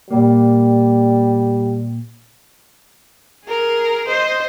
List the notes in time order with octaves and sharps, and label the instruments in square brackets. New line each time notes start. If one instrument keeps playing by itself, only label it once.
[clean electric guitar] A#2 A#3 [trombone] G3
[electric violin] G#4 A#4
C5 D#5